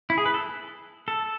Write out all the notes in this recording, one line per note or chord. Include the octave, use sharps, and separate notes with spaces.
E4
G#4
B4
A4
A4